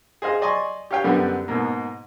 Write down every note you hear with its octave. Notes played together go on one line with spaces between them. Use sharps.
G#4 C5 D#5 F5
D5 D#5 G#5 C6 C#6
G4 C#5 F5 G5
F#2 D3 G3 B3
G#2 B2 A#3